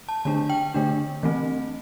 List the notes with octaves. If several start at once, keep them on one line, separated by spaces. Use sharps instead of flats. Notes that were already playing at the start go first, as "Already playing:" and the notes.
A5
D3 A3 D4 A5
G5
D3 A3 D4
E3 A3 C4